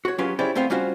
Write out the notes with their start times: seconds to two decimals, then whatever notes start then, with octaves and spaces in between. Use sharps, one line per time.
0.05 F#4 C#5
0.18 F#3 C#4 F4 G4 G#4 B4
0.39 C#4 E4 G4 G#4 C5 D5
0.55 A3 B3 C4 C5 F5
0.70 G3 C#4 F4 F#4 C5